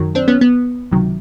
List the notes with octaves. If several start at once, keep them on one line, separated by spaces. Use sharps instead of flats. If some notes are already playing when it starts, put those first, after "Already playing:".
Already playing: F#2 D#3 F#3
C4 D4
B3 C#4
B3
C#2 C3 D#3 F#3